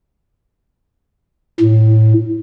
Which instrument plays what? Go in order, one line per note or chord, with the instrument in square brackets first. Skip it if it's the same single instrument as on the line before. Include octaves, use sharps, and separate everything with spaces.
[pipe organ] A2